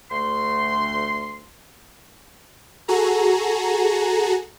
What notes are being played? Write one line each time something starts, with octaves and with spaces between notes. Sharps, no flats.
D2 A3 C6
F#4 G#4 A4 A#5